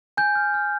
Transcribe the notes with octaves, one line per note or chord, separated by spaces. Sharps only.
G#5 G6
F6
F6